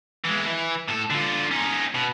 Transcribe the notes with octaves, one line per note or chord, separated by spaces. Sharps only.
E3 G#3
E3
A2 A4
D3 F4
C#4 D#4
B2